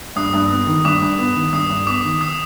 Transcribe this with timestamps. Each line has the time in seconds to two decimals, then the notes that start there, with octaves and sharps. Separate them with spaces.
0.16 G2 D#6
0.33 G2
0.50 B3
0.67 D#3
0.85 G2 D6
1.02 G2
1.19 B3
1.36 D#3
1.53 G2 D#6
1.70 G2
1.87 B3 D6
2.04 D#3
2.21 D#6